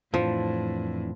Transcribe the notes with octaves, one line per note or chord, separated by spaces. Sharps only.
F2 A2 E3 F3 D4